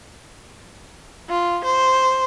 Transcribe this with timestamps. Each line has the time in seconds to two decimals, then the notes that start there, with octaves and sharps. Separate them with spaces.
1.29 F4
1.64 C5